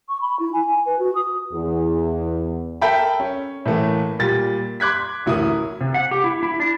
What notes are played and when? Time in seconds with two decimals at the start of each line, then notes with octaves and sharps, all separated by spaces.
0.09 C#6
0.21 B5
0.40 E4
0.53 G#5
0.68 G#5
0.86 B4
0.99 F#4
1.15 D#6
1.52 E2
2.81 A4 A#4 E5 G5 A5 B5
3.20 C#4
3.66 A2 E3 A3 A#3
4.19 A#2 G3 A6
4.80 C6 D6 F#6 G#6 B6
5.26 A1 D2 E4 F#4 A#4 D#6
5.81 C3
5.94 F#5
6.11 G4
6.24 E4
6.43 E4
6.60 D4